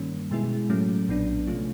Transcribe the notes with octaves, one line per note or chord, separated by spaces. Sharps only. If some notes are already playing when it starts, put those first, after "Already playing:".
Already playing: G2 D#3 G3 A#3 C#4
B2 G#3 B3 E4 G#4
A2 F#3 A3 C#4
A#1 A#2 F#3 B3 D4
C3 F3 A3 C#4 F4